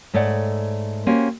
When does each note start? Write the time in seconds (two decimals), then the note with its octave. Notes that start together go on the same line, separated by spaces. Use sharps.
0.14 G#2 A3 C#5 D5 F#5
1.06 A#3 C#4 F#4 G4 C5